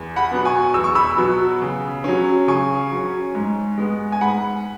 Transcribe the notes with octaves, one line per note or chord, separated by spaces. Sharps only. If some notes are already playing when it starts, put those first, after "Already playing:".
Already playing: E2
F#5 B5
B2 F#3 B3
G#5 C#6
E2 E6
C#6
B5 E6
B2 F#3 B3
C#3
F#3 C#4
C#3 G#5 C#6
F#3 C#4
G#2
G#3 B3
G#5
G#2 F#5 B5